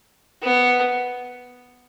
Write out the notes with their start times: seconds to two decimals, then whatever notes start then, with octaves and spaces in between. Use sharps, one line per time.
0.42 B3